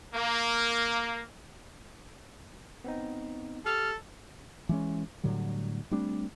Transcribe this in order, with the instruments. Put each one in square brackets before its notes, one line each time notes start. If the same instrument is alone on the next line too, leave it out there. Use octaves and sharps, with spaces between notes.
[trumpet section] A#3
[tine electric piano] B3 C4 D#4
[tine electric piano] G4 [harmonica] A4 [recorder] F6
[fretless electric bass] E3 G#3 C#4
A2 D3 F#3 G3
G3 A3 C4 D4